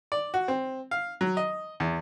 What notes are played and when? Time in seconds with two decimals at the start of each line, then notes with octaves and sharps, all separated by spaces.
0.12 D5
0.34 F#4
0.48 C4
0.91 F5
1.21 F#3
1.37 D#5
1.80 E2